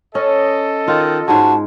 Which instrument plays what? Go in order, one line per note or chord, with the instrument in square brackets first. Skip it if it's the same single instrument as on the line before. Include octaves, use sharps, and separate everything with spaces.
[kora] C#4 [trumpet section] A4 D#5
[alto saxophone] D#3 [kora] F4
[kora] G#2 G#3 [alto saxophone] F#4 [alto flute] A5